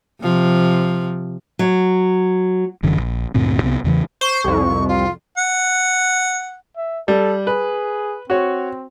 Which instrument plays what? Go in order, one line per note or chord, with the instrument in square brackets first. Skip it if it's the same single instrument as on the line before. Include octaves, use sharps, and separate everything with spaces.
[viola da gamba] C3 F3
[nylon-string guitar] F#3
[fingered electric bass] F#1 F#2 D3 E3
A#1
D2 G2 A#2 C4
C2 C3 G#3 B3
E2 C#3 E3
[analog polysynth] C5 [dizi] C#6
[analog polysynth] C2 F2
[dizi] F4
[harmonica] F#5
[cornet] E5
[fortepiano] G3 [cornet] A4
[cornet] G#4 [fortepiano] B4
[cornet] C4 [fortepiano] F#4 C#5